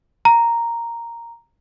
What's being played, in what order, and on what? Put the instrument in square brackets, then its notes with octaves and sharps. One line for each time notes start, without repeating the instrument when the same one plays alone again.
[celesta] A#5